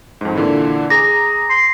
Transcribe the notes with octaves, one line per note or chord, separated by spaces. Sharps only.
F2 G#2
A#2 D3 E3
G#4 A#5 D6 A#6
C6